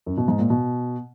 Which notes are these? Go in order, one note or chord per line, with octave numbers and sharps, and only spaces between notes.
F#2
B2
G#2
A#2
B2